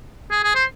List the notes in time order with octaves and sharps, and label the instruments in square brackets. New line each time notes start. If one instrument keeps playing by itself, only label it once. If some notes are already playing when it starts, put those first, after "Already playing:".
[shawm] G#4
G#4
C5